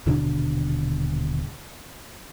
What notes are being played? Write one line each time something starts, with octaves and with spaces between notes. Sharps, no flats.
D#1 B2 D3 D4